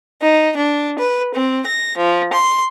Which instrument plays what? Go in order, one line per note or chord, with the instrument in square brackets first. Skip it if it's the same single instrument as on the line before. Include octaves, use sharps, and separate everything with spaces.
[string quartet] D#4
D4
B4
C4
A#6
F3
C6